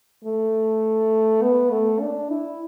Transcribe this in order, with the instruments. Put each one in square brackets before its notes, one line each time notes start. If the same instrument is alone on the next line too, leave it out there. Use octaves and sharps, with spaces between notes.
[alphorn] A3
B3
A3
D4
E4